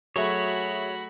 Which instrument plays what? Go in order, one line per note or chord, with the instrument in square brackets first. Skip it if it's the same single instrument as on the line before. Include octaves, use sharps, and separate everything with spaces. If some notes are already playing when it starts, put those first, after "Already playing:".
[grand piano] F#3 A3 [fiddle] F#4 B5 [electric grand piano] G#4 E5 [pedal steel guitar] C#5